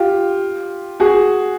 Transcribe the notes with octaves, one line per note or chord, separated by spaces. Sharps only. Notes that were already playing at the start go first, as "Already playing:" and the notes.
Already playing: F4 G4
F#4 G#4